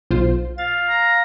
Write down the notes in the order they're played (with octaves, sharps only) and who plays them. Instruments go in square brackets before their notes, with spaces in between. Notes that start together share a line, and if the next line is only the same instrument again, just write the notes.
[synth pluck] B1 F4 C5
[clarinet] F5 [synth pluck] A6
[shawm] A#5